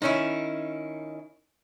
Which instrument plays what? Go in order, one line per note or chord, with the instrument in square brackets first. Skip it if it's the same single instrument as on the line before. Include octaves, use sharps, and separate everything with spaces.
[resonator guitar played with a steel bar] D#3 C#4 E4 [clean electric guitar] D#4